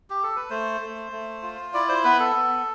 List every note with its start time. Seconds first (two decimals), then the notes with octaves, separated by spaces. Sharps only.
0.10 G4
0.23 A4
0.36 B4
0.50 A3 C5
0.81 A3
1.12 A3
1.43 F4
1.74 E4 D5
1.89 C5
2.04 B3 B4
2.20 A4
2.35 B3